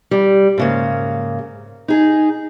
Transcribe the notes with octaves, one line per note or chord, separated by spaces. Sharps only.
G3
G#2 C#3 A#3
D#4 G#4